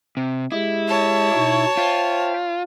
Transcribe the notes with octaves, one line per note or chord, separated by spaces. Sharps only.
C3
G#3 E4 G4 G#4
C#5 A5
B2 D#4 C#6
F4 C5 E5 G5